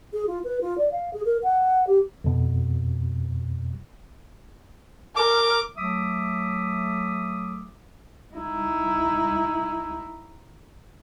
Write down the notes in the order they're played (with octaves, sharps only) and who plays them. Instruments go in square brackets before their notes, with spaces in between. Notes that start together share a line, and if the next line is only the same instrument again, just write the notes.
[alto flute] G#4
F4
B4
F4
D5
F5
G#4
A#4
F#5
G4
[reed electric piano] F2 B2
[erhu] A#4 [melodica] D6
[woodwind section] F#3 A3 E5 D6 D#6
[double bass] D#4 E4